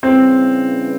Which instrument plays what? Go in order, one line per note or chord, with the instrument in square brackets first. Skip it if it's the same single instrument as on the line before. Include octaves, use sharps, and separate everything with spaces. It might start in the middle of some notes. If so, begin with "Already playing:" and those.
[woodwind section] C#3 E3 G3 A#3 C#4 [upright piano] C4